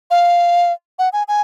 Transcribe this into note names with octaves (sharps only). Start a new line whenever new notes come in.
F5
F#5
G#5
G#5